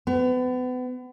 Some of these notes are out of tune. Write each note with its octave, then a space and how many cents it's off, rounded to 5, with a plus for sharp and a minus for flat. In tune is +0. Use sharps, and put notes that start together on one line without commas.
B3 +35